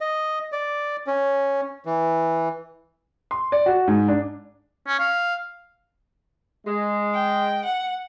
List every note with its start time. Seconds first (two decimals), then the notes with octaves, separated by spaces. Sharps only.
0.01 D#5
0.52 D5
1.07 C#4
1.85 E3
3.31 C6
3.52 D5
3.66 F#4
3.87 G#2
4.08 D4
4.87 C#4
4.99 F5
6.65 G#3
7.14 G5
7.65 F#5